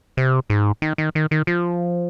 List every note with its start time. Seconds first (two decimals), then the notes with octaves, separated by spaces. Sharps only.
0.17 C3
0.50 G#2
0.82 D#3
0.98 D#3
1.15 D#3
1.31 D#3
1.47 F3